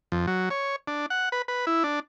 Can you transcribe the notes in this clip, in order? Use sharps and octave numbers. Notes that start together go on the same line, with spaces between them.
F2
F#3
C#5
D4
F#5
B4
B4
E4
D4